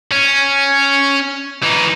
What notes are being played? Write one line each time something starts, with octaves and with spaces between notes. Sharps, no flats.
C#4
E3 D#4